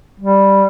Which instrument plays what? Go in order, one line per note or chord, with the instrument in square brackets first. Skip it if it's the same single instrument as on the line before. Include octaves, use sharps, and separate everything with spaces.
[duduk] G3